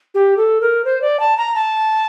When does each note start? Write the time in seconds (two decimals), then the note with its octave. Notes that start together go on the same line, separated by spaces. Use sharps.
0.14 G4
0.37 A4
0.61 A#4
0.85 C5
1.02 D5
1.20 A5
1.37 A#5
1.55 A5